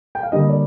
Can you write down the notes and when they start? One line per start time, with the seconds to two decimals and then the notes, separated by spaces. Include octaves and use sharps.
0.15 G5
0.23 F5
0.32 D3 G3 A#3 D#5
0.49 D5